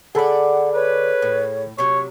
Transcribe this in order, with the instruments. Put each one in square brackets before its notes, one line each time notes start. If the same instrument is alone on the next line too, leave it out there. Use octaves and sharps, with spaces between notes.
[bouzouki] D3 D5 [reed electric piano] G#4 A4 B5 [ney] F#5
[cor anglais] B4 [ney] C#5
[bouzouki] A2
[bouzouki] C3 F#3 [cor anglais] C#5